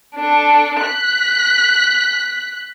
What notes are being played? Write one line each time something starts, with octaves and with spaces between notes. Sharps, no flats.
D4 A4
F#6 B6